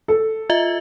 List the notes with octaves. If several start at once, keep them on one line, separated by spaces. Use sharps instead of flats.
A4
F4 D#5 E5